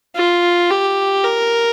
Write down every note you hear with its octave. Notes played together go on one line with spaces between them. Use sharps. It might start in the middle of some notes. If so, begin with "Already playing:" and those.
F4
G4
A#4